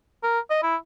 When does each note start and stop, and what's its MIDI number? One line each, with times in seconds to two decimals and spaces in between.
0.24 0.40 70
0.50 0.58 75
0.63 0.76 64